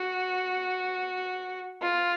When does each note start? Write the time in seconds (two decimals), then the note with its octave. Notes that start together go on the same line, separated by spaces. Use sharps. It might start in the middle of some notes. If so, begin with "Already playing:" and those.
Already playing: F#4
1.81 F4